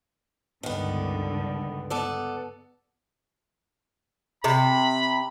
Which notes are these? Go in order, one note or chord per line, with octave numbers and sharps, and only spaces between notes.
C#2 G2 D3 D#3 B3
B3 A4 D5
C3 B5